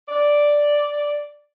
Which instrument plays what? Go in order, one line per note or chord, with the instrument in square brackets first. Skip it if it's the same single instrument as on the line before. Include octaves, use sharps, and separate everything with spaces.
[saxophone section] D5